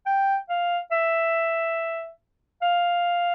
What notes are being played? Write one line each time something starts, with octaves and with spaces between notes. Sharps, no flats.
G5
F5
E5
F5